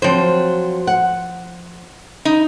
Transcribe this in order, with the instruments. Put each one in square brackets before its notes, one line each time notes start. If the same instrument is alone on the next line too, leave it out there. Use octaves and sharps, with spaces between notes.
[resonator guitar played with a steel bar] F3 C5 [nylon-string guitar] F#3 C4
[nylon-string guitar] F#5
[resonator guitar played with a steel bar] D#4